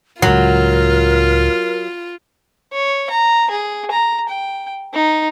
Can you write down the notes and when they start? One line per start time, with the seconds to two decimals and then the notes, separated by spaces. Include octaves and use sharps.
0.22 C#2 A2 F#3 F4 A#4
2.73 C#5
3.10 A#5
3.51 G#4
3.91 A#5
4.28 G5
4.93 D#4